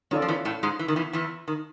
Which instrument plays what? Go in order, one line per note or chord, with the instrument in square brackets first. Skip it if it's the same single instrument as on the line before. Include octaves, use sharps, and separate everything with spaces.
[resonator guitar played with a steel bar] D#3 [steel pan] C#4 F4 A4 D5
[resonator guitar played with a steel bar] F3
E2 E3
A2 A3
G#2 G#3
E3
D#3
E2 E3
E2 E3
D#3